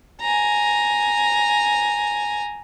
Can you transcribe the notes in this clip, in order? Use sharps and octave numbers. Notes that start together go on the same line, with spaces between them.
G#5 A#5